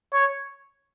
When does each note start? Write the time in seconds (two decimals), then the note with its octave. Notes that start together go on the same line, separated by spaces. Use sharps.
0.13 C#5